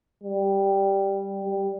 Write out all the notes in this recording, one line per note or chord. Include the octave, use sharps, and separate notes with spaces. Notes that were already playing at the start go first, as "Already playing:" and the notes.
G3
G3